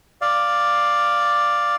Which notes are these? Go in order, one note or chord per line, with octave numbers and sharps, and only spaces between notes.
D5 F5